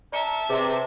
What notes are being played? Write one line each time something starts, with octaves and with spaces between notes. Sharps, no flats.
A#4 D5 E5 A5 C#7
C3 G#4 B4 D5